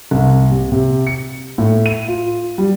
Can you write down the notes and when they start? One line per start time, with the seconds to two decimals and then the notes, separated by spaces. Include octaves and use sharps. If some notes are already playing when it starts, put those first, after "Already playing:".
0.11 C2
0.51 C3
0.72 C3
1.07 C#7
1.58 A2
1.86 D#7
2.08 F4
2.58 G3